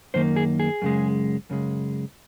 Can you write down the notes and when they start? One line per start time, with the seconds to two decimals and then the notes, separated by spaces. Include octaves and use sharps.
0.14 F#2 D#3 A#3 C5
0.36 G#4
0.60 G#4
0.82 F#2 C#3 G#3
1.50 F#2 C#3 G#3